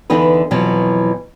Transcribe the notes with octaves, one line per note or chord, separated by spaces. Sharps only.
E2 D3 E3 B3 D#4 B4
F2 B2 E3 F#3